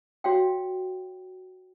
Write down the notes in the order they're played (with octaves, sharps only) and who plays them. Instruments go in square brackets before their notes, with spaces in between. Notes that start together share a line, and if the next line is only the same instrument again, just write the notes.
[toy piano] F#4 C#5 F5 G5